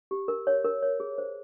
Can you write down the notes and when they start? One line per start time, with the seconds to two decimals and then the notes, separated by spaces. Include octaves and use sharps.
0.11 G4
0.28 A#4
0.47 C#5
0.65 A#4
0.82 C#5
1.00 G#4
1.18 C5